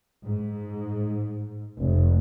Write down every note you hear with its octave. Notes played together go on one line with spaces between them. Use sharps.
G#2
F1